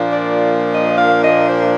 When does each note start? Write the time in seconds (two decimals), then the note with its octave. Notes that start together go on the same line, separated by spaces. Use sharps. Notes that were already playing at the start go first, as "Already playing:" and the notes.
Already playing: A#2 F3 A#3 D4
0.09 D5
0.71 D#5
0.96 F5
1.21 D#5
1.46 C5